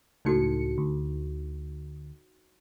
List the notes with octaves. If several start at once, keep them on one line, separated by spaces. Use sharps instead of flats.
C#2 A2 D#4 F#4 A4 C#7
D2